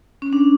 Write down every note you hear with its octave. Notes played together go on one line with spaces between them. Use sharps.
C#4
D4